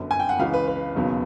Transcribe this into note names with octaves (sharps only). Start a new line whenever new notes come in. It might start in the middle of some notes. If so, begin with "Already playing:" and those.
Already playing: G1 F#2 D3
G#5
G5
F#5
C#2 C#3 E3 F5
B4
B4
E1 D#2 C#3 F#3 B3